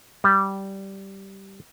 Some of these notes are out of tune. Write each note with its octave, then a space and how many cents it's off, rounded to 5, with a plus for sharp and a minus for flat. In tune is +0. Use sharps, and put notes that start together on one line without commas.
G3 -10